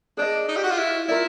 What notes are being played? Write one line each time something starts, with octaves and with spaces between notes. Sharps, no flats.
D4 G#4 C5 D#5
D#4
G4
F#4
F4
E4
E4 F4 A#4 D5